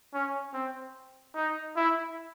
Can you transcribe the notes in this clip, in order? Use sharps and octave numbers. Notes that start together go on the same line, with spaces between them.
C#4
C4
D#4
E4